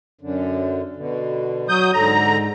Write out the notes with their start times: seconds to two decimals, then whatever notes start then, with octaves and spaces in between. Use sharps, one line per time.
0.21 F#2 D3
0.96 B2 D3
1.69 F#3 D#6 G6
1.93 G#2 D3 A#5